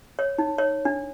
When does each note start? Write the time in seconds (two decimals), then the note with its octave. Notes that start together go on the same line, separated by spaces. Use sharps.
0.19 C#5
0.38 D#4
0.58 C#5
0.85 D4